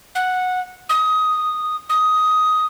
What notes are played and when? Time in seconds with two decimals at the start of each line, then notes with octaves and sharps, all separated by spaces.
0.15 F#5
0.89 D#6
1.90 D#6